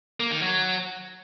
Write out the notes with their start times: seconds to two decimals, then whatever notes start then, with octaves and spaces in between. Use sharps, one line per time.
0.20 A#3
0.31 D#3
0.42 F#3